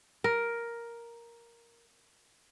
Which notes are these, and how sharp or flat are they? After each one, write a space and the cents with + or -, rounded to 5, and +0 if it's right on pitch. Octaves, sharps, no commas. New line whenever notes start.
A#4 +5